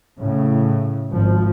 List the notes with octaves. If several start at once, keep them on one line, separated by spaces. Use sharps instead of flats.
A2 C#3
G#1 F3